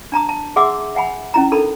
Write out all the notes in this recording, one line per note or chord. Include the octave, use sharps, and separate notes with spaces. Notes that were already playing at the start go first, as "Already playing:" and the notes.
D4 A5 A#5 D#6
A5
G#4 E5 F#5 C6 D6 E6
E5 F#5 G#5 B5
C#4 E4 A#5
D4 D#4 A4 A#4 B5